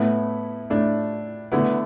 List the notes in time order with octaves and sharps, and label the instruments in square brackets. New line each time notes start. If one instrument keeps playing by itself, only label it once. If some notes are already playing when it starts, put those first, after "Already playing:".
Already playing: [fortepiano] A2 A3 E4 [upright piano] B3
[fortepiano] A2 A3 E4 [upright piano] D4
[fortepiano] D3 A3 E4 [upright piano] B3